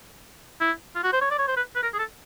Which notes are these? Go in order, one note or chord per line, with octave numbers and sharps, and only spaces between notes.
E4
F4
F#4
C5
C#5
D5
C#5
C5
B4
B4
A#4
G#4
A4